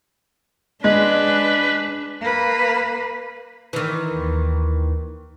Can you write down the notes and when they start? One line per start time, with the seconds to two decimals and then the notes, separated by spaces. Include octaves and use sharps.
0.84 G#3 D4 B4
2.21 A#3 B4
3.73 D#3 E3
4.13 D#2